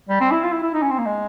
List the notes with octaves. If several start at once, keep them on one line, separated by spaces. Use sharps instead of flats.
G3
C4
E4
F4
E4
E4
D#4
C#4
C4
A#3
G#3